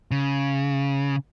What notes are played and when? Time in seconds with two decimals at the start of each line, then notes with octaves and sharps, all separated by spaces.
0.11 C#3